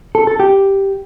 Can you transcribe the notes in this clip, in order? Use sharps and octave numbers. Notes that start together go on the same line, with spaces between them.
A4
A4
G4